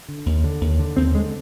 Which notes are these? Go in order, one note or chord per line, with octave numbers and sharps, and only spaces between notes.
D3
D#2
D3
D#2
D3
D#2 C4
D3 G#3